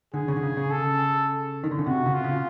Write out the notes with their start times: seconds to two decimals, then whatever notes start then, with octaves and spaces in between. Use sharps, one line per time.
0.14 D3 G#4
0.28 C#3
0.36 D3
0.43 C#3
0.57 C#3
0.71 A4
1.64 D#3
1.71 D3
1.79 C#3
1.86 C3 F#4
2.06 C#3
2.14 F4
2.24 C#3